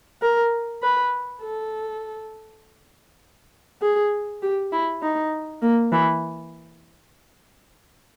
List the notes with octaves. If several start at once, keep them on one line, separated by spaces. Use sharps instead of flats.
A#4
B4
A4
G#4
G4
E4
D#4
A#3
E3